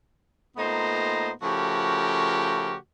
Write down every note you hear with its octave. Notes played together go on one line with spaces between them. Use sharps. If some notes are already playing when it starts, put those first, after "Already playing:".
A#2 A3 B3 D#4 C5 A#5
C#3 F3 A3 F#4 G4 A#4